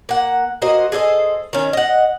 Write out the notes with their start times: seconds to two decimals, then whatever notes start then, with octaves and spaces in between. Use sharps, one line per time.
0.09 A#3 F#5
0.62 A#3 F#4 C5 D#5
0.92 G#4 A4 C5 D#5
1.53 D#3 C#4
1.73 D#5 F#5